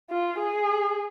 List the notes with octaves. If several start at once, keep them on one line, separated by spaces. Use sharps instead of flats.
F4
G#4